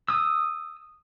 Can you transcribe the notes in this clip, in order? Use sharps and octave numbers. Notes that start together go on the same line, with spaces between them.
D#6 E6